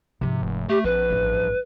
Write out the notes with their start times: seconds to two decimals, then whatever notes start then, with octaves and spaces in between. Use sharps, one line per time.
0.21 G#2 C3 F3
0.42 F1
0.69 A3 G4
0.84 A#1 C4 B4
1.10 A1 G2